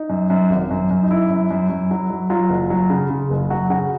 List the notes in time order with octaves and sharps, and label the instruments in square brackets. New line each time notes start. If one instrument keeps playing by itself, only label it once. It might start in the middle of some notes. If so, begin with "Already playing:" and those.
Already playing: [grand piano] D#4
F#2
F#2
G#1
F#2
F#2
D#4
F#2 E4
F#2
F#2
F#2
F#3
F#3
F#3 F4
F#1
F#3
C#3
C#3
F#1
F#3 F#4
C#3 F#4